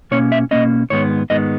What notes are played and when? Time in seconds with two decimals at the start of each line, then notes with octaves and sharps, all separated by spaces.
0.11 B2 A#3 C#4 C#5
0.32 E5
0.51 B2 A#3 C#4 D#5
0.90 G#2 D#3 G#3 B3 C#5
1.30 G#2 D#3 G#3 B3 D#5